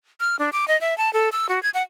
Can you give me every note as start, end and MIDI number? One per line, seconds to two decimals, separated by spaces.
0.20 0.36 89
0.39 0.50 62
0.53 0.68 86
0.68 0.79 75
0.81 0.96 76
0.98 1.12 81
1.13 1.29 69
1.32 1.47 88
1.49 1.62 66
1.63 1.70 92
1.74 1.83 78